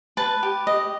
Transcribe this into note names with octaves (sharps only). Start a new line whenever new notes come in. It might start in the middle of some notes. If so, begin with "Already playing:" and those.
B4 A5
G4
D#5